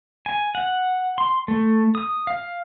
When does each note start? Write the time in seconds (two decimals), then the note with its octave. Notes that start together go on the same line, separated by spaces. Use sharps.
0.26 G#5
0.55 F#5
1.18 C6
1.48 A3
1.95 D#6
2.27 F5